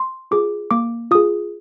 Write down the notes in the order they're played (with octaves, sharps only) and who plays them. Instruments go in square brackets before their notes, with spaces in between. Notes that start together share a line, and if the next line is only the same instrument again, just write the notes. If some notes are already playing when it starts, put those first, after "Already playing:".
Already playing: [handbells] C6
F4 G#4 D6
A#3 D6
F4 G#4 D#6